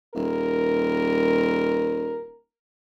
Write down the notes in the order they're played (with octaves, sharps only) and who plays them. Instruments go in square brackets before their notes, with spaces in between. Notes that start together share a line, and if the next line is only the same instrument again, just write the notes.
[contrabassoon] D#1 [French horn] A#4